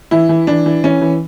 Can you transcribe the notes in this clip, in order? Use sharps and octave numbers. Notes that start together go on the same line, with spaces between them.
E3 E4
E3
E3 D4
E3
E3 C#4
E3